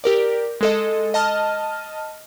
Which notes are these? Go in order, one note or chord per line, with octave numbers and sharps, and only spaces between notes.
G4 A#4 D5
G#3 A4 D#5
D#5 A5 F6